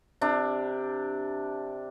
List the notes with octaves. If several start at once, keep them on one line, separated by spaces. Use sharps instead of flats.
C3 D4